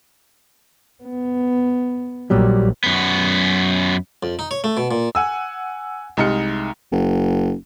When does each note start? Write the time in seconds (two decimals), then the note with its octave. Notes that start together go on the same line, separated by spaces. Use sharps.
1.04 B3
2.30 A#1 A#2 F#3 G3
2.84 F#2 B3
4.23 F2
4.39 D#4
4.51 C#5
4.64 A3
4.77 B2
4.91 A#2
5.15 F#5 G#5 E6
6.17 C2 G#3 D#4 A#5 F6 C#7
6.92 F#1